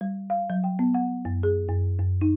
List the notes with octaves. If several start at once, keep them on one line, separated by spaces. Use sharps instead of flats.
G3
F5
F#3
G5
B3
F#5
F#2
G#4
F#2
F#2
D#4